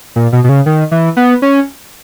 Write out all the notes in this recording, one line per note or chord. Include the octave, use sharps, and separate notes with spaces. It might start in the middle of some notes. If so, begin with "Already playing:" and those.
A#2
B2
B2
C#3
D#3
E3
B3
C#4